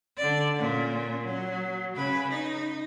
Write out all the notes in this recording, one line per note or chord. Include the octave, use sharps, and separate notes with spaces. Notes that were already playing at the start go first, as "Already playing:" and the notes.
D3 D5
A#2 C#4
F#3
C#3 B4
D#4